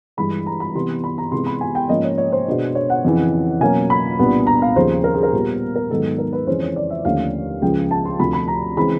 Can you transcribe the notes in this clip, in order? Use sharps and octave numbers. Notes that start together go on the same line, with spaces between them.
G2 E3 G#3 B5
A#5
B5
C3 E3 G3 B3 C6
B5
A#5
C3 E3 G#3 B3 C6
B5
G#5
G5
G#2 F3 A#3 C#4 D#5
C#5
C#5
C5
B2 G#3 B3 D4
C#5
F#5
F2 C#3 E3
B2 F#3 A#3 C#4 G#5
B5
C2 A#2 G3 B3 D4
A#5
F5
D#2 C#3 F3 C5
A#4
G#4
A#4
A#2 G3 B3
A#4
G#2 D#3 F#3 B3 A4
A#4
B4
F2 C#3 E3 G#3 C#4 C5
C#5
D5
E5
D#2 D3 F3 A3 C#4 F5
C#2 C#3 F3 G5
A5
C6
D2 C3 F3 A3 B5
B5
A#5
C#3 E3 G#3 C4 B5